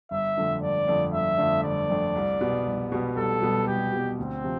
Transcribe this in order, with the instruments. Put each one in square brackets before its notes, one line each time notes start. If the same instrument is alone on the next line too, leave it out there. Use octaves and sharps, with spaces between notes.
[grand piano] G1 [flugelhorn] E5
[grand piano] F2 D3 A3 D4
[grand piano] G1 [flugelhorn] D5
[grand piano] F2 D3 A3 D4
[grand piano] G1 [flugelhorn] E5
[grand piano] F2 D3 A3 D4
[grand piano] G1 [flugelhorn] D5
[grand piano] F2 D3 A3 D4
C2
B2 G3 B3
C2
B2 G3 B3
[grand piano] C2 [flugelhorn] A4
[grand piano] B2 G3 B3
[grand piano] C2 [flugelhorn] G4
[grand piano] B2 G3 B3
[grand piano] D2 [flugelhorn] C4
[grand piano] C3 F3